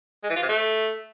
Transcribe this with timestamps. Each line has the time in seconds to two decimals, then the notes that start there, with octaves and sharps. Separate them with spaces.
0.23 G#3
0.30 E3
0.36 F4
0.43 C3
0.49 A3